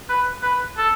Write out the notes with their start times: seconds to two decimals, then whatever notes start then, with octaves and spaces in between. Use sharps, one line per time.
0.10 B4
0.43 B4
0.78 A4